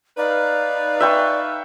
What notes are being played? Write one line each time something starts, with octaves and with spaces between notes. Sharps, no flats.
D#4 B4 D5 F5
E5 G5 C#6